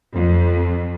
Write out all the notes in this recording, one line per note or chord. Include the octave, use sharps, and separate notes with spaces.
F2